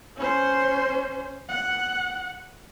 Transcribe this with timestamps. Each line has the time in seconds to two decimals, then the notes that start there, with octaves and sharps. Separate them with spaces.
0.16 C#4 C5
1.49 F#5